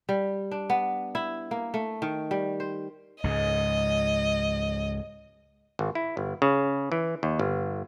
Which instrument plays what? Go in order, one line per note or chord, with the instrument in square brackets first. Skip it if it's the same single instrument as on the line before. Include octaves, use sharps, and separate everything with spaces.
[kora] G3
D4
B3
E4
A#3
A3
D#3
G3
C5
[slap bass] C#2 G#2 [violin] D#5
[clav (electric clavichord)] G#1
E4
G1
C#3
E3
D#2
G1